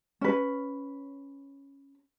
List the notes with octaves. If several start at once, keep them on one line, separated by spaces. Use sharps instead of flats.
C#4 B4